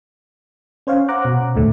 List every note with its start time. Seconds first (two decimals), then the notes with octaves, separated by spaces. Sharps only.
0.87 C#4 C5 C#5 F5
1.08 C5 F#5 A#5 D6 F#6
1.25 B2
1.56 D#2 A2 D3 A3